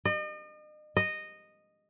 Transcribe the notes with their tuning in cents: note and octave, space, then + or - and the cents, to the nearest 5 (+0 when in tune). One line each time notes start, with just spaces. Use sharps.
D#5 -40
D#5 -10